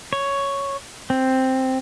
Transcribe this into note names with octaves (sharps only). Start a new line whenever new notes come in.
C#5
C4